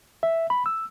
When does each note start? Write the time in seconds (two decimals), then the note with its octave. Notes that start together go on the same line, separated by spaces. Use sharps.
0.23 E5
0.50 B5
0.66 E6